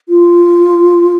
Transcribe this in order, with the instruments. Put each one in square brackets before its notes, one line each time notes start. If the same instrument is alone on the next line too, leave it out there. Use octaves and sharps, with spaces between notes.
[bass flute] F4